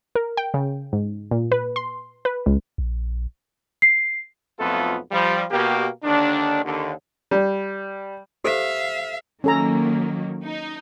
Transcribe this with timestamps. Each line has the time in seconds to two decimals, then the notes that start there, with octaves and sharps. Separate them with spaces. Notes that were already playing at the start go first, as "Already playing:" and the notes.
0.15 A#4
0.37 G5
0.54 C#3
0.93 G#2
1.31 A#2
1.52 B4
1.76 C6
2.25 B4
2.46 C#2
2.78 A#1
3.82 C7
4.60 B1 F2 A3 B3 F4 A4
5.11 F3 G3
5.50 B2 A#3 G4
6.03 D#2 D3 D#3 D4
6.64 D#2 D3
7.31 G3
8.44 G4 A4 C5 E5 F5
9.44 D#3 F#3 A#3 C#4 A4 A#5
10.45 D#4